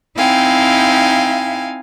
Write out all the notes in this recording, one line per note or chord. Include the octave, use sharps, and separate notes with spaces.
C4 D#4 E4 F5 G5 G#5